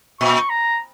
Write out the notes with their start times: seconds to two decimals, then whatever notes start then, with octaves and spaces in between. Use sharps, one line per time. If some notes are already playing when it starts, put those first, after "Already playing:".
0.20 A#2 C#6
0.50 A#5